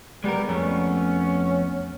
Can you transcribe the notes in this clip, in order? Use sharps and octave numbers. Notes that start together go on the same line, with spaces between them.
G3 G#3 B3 A#4
F2 A3 B3 C#4